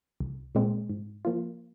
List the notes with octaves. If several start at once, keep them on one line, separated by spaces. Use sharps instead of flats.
C2
A#2 G#3 C4
G#2
F3 A#3 F4